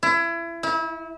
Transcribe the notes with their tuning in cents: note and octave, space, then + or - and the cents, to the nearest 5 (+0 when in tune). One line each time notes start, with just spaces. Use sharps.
E4 +30
E4 -30